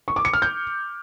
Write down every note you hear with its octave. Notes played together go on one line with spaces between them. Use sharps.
C#6
D6
C#7
F6
G6